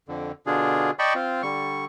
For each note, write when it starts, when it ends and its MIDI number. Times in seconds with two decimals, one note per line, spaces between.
0.08 0.32 41
0.08 0.32 50
0.46 0.91 47
0.46 0.91 50
0.46 0.91 62
0.46 0.91 65
0.46 0.91 68
0.99 1.14 74
0.99 1.14 75
0.99 1.14 79
0.99 1.14 81
0.99 1.14 83
0.99 1.14 85
1.15 1.42 60
1.15 1.42 65
1.43 1.85 50
1.43 1.85 55
1.43 1.85 85